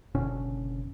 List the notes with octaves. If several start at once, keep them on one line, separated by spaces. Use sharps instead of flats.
F#1 B2 D3 C#4